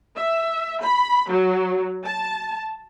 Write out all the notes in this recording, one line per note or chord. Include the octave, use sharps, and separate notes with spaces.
E5
B5
F#3
A5